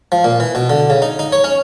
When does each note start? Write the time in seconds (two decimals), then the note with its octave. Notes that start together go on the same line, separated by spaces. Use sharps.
0.12 F3
0.24 A#2
0.40 E3
0.55 B2
0.70 D3
0.90 C#3
1.02 D#4
1.19 D#4
1.32 C#5
1.44 C#4